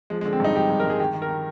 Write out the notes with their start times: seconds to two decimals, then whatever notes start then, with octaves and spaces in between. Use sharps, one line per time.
0.10 F3 G#3
0.21 G#3
0.25 D3
0.33 C4
0.40 G2 D#4
0.55 G2 G4
0.70 G2
0.80 A#4
0.85 G2
0.90 G#4
0.99 D#3 G4
1.14 D#3
1.22 A#4
1.29 D#3